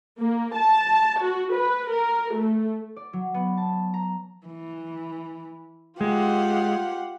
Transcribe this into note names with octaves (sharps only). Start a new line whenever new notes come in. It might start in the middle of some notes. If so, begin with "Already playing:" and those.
A#3
A5
F#4
B4
A#4
A3
D5
F#3
B3
A5
A#5
E3
G#3 F4 G4 F#5